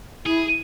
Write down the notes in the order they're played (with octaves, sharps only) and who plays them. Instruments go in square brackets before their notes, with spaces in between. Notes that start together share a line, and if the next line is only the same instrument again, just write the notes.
[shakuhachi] E4 [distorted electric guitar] G#4